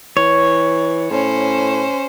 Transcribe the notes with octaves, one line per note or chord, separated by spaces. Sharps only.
E3 C#5
A2 C#4 C5